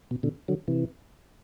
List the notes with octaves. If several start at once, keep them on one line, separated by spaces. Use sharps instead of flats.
B2
B2 D3
D3 F#3
C3 E3